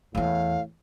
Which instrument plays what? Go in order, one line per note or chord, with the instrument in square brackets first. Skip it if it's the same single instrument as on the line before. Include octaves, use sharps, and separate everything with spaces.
[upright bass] E2 E3 [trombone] A2 [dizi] F5